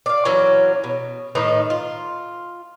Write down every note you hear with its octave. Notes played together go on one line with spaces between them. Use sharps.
D5 F5
E3 F#3 A#3 C#4
B2
A2 D#3 D#4 B4
F4